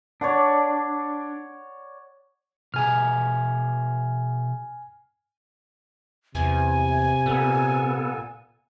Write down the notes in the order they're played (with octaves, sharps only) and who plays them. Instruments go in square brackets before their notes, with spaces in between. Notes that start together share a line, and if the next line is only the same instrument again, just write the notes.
[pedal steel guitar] D4 [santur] C#5 D5 F#5
[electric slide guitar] B2 G#4 A#5 [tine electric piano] G#5 F6
[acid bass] E2 [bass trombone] C3 [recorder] G#5
[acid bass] A#2 [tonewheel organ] B3 A4